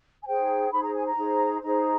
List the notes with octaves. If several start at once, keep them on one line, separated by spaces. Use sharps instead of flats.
G#5
D#4 G#4 C5 G5
D#4 G#4 C5 B5
A#5
G#5
A#5
D#4 G#4 C5
D#4 G#4 C5 A#5